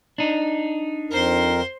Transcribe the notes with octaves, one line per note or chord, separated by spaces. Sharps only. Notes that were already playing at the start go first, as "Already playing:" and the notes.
D4 D#4
F2 A#4 C5 C6